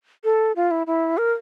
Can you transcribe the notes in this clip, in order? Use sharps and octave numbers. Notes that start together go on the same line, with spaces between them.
A4
F4
E4
E4
A#4